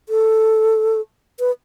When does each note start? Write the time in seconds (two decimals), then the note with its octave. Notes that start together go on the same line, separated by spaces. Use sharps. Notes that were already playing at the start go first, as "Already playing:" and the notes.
0.09 A4
1.40 B4